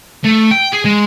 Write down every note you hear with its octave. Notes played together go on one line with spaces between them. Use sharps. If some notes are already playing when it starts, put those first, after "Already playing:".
A3
G5
G#4
G#3